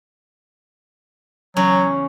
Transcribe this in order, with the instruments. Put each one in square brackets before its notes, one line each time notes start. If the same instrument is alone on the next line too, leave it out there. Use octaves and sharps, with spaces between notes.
[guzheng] E2 C#3 C#4 [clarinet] F#3